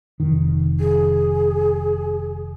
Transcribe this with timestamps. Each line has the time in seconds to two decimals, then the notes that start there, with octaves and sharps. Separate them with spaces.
0.20 F1 D#3
0.79 G#4